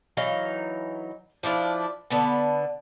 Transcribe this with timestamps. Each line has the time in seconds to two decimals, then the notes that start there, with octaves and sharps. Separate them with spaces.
0.17 E3 F#3 D#4 F5
1.43 F3 D4 E4 F4
2.11 D3 B3 B4 A5